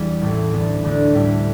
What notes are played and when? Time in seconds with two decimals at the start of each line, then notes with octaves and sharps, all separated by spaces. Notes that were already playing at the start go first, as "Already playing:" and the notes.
Already playing: E2 E3 G3 D4
0.21 A1 A2 A3 E4
0.52 D2 D3 B3
0.83 D2 D3 A3 D4
1.14 A2 G3 E4